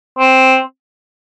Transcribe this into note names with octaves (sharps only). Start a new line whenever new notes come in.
C4